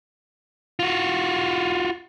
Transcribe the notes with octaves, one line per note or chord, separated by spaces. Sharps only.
F4 F#4